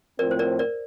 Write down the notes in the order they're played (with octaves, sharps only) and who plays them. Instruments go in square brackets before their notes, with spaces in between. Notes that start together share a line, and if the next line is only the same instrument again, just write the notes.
[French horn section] A2 F3 C4 [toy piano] A#4 D5
[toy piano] C5
A#4 D5
A#4 D5